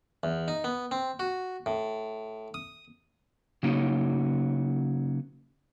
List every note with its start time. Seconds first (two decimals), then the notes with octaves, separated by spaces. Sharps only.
0.23 E2
0.48 D#4
0.64 B3
0.91 C4
1.20 F#4
1.66 A2
2.54 D#6
3.63 C#3 F#3 A#3 D#4